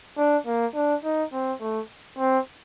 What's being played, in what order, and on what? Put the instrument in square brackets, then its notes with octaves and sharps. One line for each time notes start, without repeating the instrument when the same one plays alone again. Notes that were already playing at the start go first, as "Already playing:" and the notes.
[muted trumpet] D4
A#3
D4
D#4
C4
A3
C4